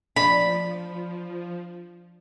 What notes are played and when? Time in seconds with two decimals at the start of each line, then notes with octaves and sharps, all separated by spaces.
0.16 F3 D4 B5